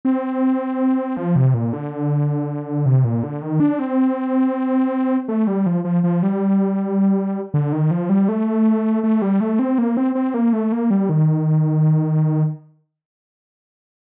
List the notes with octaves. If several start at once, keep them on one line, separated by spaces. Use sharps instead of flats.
C4
F3
C3
A#2
D3
C3
A#2
D3
D#3
D4
C4
A3
G3
F3
F3
F3
G3
D3
D#3
F3
G3
A3
A3
G3
A3
C4
A#3
C4
C4
A#3
A3
A#3
G3
D#3